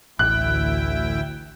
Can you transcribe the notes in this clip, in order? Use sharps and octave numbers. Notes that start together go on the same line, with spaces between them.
A1 D2 E4 G5 F#6